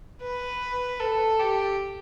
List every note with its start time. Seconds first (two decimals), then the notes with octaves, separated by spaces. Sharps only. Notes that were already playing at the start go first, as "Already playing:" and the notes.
0.22 B4
1.00 A4
1.40 G4